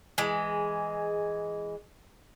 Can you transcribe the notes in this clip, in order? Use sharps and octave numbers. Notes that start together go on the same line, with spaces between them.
E3 G#3